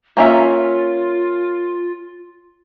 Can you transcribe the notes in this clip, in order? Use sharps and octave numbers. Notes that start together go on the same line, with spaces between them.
A#3 C#4 F4 E5